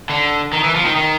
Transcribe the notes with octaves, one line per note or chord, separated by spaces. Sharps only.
D3
D#3
E3
F3
D#3
D#3